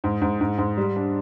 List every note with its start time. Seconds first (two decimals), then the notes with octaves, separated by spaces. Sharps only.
0.04 G#2
0.22 G#2
0.41 G#2
0.58 G#2
0.77 G3
0.96 D4